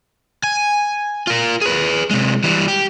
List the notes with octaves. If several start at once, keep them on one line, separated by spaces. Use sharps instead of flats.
G#5
F4 A#4
G#4 B4
C3 G#3
E3 G3
G4